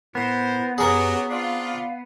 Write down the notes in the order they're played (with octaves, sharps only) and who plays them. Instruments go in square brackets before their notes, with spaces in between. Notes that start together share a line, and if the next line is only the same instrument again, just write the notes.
[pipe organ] A2 [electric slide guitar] B3 [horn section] A#4 C5
[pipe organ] F#2 G4 B4 [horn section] F#3 [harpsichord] G#4 A#4
[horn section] C4 D4 F4 [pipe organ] F5